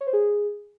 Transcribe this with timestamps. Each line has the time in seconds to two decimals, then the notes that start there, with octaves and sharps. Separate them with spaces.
0.01 C#5
0.07 C5
0.13 G#4